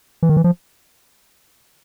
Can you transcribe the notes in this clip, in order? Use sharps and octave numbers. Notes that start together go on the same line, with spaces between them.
E3
D#3
E3
F3